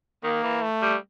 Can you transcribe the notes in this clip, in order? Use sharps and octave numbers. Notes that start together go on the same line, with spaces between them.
D#3 A#3
E3
A3
G3